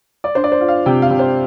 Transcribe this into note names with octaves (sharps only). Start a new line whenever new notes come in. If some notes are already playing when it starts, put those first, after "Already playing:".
D5
D4 C5
D5
C5
F4
F5
C3 G5
F5
C3
C5